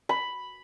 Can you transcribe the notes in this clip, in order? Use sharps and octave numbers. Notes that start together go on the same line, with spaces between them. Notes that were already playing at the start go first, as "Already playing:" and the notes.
B5